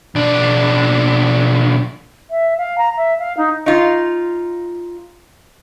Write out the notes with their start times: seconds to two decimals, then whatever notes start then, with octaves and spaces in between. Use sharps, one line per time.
0.15 B1 D4
2.30 E5
2.57 F5
2.78 A#5
2.97 E5
3.18 F5
3.37 D#4
3.66 D#4 F4